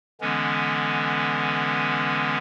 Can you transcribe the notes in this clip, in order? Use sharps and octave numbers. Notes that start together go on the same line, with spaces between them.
D3 E3 G#3 B3 C#4